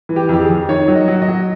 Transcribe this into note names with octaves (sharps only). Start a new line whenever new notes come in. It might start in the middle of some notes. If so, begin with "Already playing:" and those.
E3
G4
F2 G4
G#4
F2
D#3 C#5
F#3
D#5
F#3
D#5
F#3